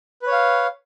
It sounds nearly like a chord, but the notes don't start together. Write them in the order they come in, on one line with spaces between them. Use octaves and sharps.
B4 C#5 F5